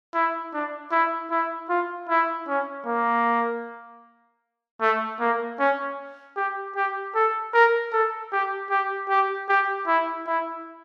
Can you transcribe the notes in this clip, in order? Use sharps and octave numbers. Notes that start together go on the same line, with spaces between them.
E4
D4
E4
E4
F4
E4
C#4
A#3
A3
A#3
C#4
G4
G4
A4
A#4
A4
G4
G4
G4
G4
E4
E4